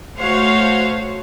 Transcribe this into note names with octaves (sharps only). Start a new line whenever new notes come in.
A3 F#4 C5 C#5 F5